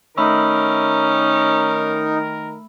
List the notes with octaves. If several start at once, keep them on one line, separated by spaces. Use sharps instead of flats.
D#3 A3 C#4 D#4 A#4 B5 E6